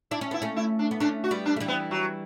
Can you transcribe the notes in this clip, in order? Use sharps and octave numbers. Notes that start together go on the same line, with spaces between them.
D4 E4
C#4
B3 E4
A3 C#4
E4
D4
B3
A3 C#4 D4
F#4
G3 B3
D4
A3
E3 G3
B3
F#3